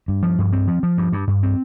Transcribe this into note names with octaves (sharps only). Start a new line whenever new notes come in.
G2
F3
G2
C4
F3
F3
G2
G2
G2
C4